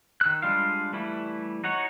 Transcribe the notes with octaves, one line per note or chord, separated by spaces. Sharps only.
D#3 E6 F#6
G3 G#3 D4 F4 F5
E3 G3 A3 E4
D#4 F#4 C#5 F#5